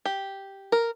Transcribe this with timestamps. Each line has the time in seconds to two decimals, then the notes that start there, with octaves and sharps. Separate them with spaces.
0.05 G4
0.72 A#4